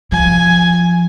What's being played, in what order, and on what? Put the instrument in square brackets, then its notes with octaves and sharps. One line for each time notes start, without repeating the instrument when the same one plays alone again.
[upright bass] F3 [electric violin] G#5